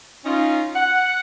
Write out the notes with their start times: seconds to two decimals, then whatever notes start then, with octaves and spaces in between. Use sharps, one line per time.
0.25 C#4 D#4 F4
0.75 F#5